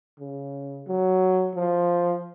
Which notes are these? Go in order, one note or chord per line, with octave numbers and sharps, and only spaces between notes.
C#3
F#3
F3